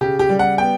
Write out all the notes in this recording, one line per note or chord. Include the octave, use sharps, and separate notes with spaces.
C#3 G4
G4
G3
F#5
B3 G5